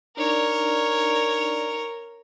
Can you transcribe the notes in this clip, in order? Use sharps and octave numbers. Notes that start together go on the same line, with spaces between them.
D4 D#4 A#4 C#5 D5